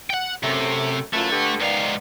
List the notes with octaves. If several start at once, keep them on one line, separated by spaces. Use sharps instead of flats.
F#5 G5
F#2 C3 A3
F#2 E3 A3 F4
D3 B3 G4
G#2 D#3 B3 D5 F5